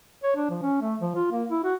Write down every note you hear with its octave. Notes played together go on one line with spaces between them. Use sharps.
C#5
D4
F3
C#4
A3
F3
F4
A#3
E4
F#4